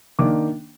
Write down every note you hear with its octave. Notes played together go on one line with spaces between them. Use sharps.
D#3 A#3 D4 D6